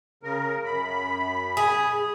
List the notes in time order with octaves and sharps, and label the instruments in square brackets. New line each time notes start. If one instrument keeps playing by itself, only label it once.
[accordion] C#3 A#4
F#2 B5
[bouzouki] G#4